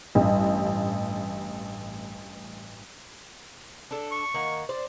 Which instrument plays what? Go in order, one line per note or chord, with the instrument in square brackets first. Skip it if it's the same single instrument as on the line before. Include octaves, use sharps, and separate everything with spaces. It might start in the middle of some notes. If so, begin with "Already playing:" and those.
[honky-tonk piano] A1 G2
[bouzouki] D4 A4
[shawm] C#6
[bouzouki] D#3 A#3 F#5
C5 D5